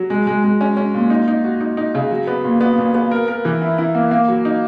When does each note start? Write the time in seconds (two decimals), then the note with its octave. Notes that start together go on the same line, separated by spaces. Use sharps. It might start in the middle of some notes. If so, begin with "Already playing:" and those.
Already playing: F#3
0.10 G#3
0.27 G#3
0.44 G#3
0.61 C#4
0.77 C#4
0.94 A#2
1.10 D#4
1.28 D#4
1.44 F#4
1.61 D#4
1.77 D#4
1.95 C#3
2.11 F#3
2.27 B3
2.44 A#2
2.61 B3
2.77 A#2
2.95 B3
3.11 A#4
3.28 A#4
3.45 E3
3.62 E4
3.78 E4
3.95 A#3
4.11 A#3
4.28 F#3
4.45 D#4